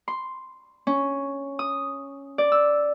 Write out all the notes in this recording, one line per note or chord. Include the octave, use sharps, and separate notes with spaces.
C6
C#4
D#6
D5
E6